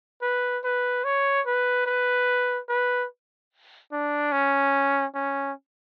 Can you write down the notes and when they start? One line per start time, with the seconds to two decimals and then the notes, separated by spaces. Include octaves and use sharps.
0.22 B4
0.64 B4
1.04 C#5
1.46 B4
1.86 B4
2.69 B4
3.92 D4
4.32 C#4
5.15 C#4